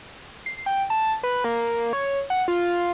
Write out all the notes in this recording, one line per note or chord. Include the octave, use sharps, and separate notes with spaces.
C7
G5
A5
B4
A#3
C#5
F#5
F4